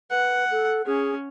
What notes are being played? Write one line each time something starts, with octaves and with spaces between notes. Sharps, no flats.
B4 F#5
A4
C#4 G#4